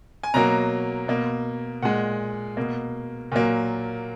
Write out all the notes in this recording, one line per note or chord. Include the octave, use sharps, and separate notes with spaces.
G#5
B2 F#3 A#3 A#5
B2 A#3
A#2 G#3 F#5
B2 A#3
A#2 F#3 A#3